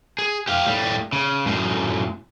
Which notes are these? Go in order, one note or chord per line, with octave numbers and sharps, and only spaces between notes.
G#4
G4 F5
A2 G3
C#3
F#2 A2